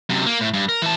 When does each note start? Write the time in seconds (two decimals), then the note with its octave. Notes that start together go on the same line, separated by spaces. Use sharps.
0.09 F#2 C3
0.26 A#3
0.41 A2
0.54 G2
0.69 A#4
0.82 E3 A5